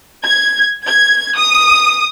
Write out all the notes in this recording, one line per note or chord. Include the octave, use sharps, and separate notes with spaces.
G#6
G#6
D#6